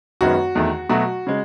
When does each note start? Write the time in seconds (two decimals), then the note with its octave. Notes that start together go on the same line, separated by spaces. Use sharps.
0.21 F#2 D#3 G#3 B3 F#4
0.55 E2 D#3 A3
0.89 B2 F#3 A3 F#4
1.27 C#3 G#3